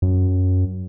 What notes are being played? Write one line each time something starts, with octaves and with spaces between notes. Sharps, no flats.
F#2